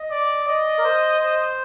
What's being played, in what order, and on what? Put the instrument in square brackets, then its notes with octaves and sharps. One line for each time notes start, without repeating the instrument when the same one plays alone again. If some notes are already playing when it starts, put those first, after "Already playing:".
Already playing: [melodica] D#5
[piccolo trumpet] D5
[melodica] D5 [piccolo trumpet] D#5
[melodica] A#4
C5
C5